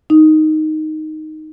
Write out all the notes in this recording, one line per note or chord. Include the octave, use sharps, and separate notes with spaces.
D#4